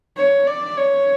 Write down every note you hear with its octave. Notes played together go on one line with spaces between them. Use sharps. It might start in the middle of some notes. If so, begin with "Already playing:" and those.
C#5
D5
C#5